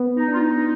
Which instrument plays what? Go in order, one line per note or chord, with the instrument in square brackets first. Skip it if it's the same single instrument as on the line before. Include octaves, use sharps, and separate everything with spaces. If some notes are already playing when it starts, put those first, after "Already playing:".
Already playing: [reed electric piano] B3
[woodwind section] D#4
[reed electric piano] D4
[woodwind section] F4
D#4